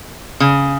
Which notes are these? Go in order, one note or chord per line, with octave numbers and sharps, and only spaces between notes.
C#3